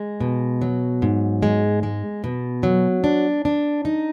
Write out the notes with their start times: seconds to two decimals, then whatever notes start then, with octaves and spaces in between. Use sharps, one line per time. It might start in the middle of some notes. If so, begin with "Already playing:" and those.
Already playing: G#3
0.21 B2
0.61 F#3
1.02 G#2
1.43 G#3
1.83 G#3
2.24 B2
2.63 F#3
3.04 D4
3.45 D4
3.85 D#4